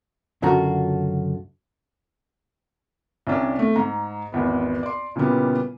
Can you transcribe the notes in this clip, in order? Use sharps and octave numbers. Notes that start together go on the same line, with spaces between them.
C#2 F#2 D3 F4 F#4 A#5
C2 C#4 D4
A3
G#2 A#5
G#1 E2 B3
D5 C6
A#2 C#3 E3 G3 B3